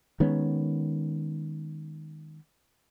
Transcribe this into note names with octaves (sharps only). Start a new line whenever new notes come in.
D#3 G#3 B3 C#4